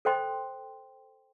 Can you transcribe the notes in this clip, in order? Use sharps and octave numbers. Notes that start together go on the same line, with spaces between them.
A4 C5 G5 C6